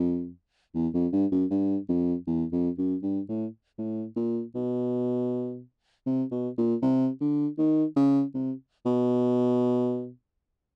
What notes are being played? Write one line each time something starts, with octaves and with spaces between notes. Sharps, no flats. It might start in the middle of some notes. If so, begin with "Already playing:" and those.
Already playing: F2
E2
F2
G2
F#2
G2
F2
E2
F2
F#2
G2
A2
A2
A#2
B2
C3
B2
A#2
C3
D3
D#3
C#3
C3
B2